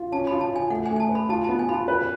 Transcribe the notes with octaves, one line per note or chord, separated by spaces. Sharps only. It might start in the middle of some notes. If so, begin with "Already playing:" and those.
Already playing: F4
C#4 A5
F4 B5
A5
F4 G#5
A3 F#5
G#5
A3
G#5
A5
B4
B5
F4 A5
B3 A5
G#5
F4 B5
A5
B4